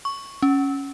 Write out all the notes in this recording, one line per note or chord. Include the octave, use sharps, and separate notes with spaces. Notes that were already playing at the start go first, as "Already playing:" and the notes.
C#6
C#4